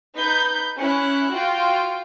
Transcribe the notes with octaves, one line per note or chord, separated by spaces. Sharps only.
D#4 B4 B5 G6
C#4 E4 F#6
F4 F#4 G5